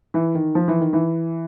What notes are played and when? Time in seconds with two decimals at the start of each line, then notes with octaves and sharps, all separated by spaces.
0.14 E3
0.34 D#3
0.55 F3
0.68 E3
0.80 D#3
0.93 E3